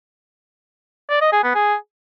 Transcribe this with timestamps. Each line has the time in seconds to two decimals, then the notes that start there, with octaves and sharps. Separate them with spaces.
1.10 D5
1.21 D#5
1.32 G#4
1.44 B3
1.55 G#4